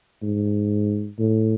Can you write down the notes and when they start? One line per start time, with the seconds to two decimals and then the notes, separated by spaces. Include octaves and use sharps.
0.22 G#2
1.19 A2